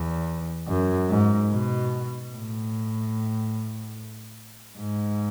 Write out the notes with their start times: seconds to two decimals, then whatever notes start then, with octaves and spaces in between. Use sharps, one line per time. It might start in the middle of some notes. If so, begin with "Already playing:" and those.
Already playing: E2
0.68 F#2
1.10 G#2
1.51 B2
2.32 A2
4.78 G#2